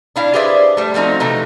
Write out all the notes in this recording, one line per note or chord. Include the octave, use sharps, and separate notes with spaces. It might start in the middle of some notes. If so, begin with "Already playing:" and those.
D4 E4 F5
G4 G#4 B4 C5 D5 E5
G3 A3
F3 A3 C4 D#4 F#4
C3 E3 F3 A3 D#4